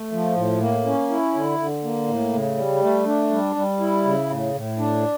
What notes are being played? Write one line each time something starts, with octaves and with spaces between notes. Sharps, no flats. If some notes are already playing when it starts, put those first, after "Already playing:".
Already playing: A3
F3
A2
A#3
C#4
E4
D3
D3
A#3
A2
C#3
G3
A3
D4
G3
G3
E4
C#3
A2
A2
D4